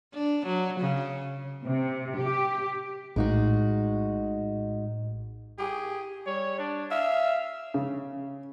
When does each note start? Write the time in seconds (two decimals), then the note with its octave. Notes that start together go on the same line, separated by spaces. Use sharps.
0.14 D4
0.46 F#3
0.80 C#3
1.64 C3
2.18 G4
3.16 A#1 A2 G#3 D#4 F#4
5.59 G4 G#4
6.27 G3 C#5
6.59 D4
6.91 E5 F5
7.74 C#3